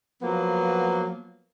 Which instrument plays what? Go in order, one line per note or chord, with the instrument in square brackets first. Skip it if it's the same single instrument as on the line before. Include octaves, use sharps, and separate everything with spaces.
[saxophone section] F3 F#3 A#3 B3